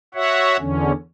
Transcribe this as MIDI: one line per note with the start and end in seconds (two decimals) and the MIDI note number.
0.15 0.57 66
0.15 0.57 73
0.15 0.57 76
0.15 0.57 78
0.60 0.92 40
0.60 0.92 50
0.60 0.92 61